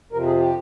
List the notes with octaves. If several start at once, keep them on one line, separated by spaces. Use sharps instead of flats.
F2 C3 F3 A#4
G#4
G4